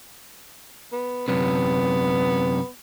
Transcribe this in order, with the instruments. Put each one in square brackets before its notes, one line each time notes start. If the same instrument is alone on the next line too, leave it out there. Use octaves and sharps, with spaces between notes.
[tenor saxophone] B3
[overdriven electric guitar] F#2 C3 [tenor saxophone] B3